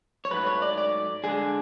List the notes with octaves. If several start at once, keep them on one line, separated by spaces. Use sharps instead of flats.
C#5
G#2 F#3 A3 B4
C#5
D5
D5
D3 G#3 D4 G#4